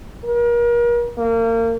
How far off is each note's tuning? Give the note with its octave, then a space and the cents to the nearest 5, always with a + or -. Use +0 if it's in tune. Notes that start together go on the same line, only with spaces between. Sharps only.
A#4 +35
A#3 -30